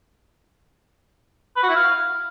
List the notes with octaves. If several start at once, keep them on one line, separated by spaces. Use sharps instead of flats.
B4
F#4
E4
F5